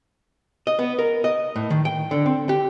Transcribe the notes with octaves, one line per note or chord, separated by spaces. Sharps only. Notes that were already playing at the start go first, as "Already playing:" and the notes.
D#5
B3
A#4
D#5
A2
D#3
G5
D3
C4
G4